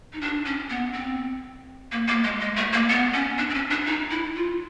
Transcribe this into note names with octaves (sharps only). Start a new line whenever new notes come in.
D#4
D4
C#4
B3
C4
A#3
A#3
G#3
G#3
A3
A#3
B3
C#4
D4
C4
C#4
D4
D#4
E4
F4